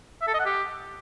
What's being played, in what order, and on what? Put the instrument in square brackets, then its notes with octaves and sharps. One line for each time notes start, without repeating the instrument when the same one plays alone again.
[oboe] E5
A4
D#5
F#5
G4